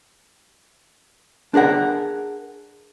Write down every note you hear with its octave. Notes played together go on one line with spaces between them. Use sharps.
D4 G#4 A#4 F#5